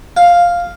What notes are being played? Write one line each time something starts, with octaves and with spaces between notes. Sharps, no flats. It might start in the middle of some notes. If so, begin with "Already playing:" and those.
F5